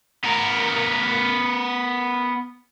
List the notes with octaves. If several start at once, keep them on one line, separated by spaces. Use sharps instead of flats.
B3 A#4